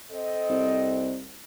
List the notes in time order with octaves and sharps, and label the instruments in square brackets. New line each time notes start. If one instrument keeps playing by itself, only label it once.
[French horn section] C4 A4 D#5
[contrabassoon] C2